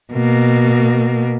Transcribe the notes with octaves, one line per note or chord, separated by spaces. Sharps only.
B2 A#3